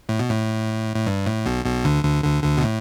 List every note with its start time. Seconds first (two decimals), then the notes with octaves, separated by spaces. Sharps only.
0.09 A2
0.20 B2
0.31 A2
0.96 A2
1.07 G2
1.26 A2
1.46 B1 B2
1.65 B1 B2
1.85 D2 D3
2.04 D2 D3
2.24 D2 D3
2.43 D2 D3
2.58 B2
2.63 A2